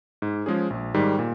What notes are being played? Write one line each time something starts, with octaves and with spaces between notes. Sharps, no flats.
G#2
F3 G#3 C#4 G#4
A#1
G#2 D#3 G3
A#2